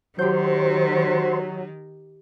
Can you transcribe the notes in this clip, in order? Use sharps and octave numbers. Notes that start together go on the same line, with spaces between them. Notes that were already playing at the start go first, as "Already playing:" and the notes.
D#3 F#3 G4 C5 G6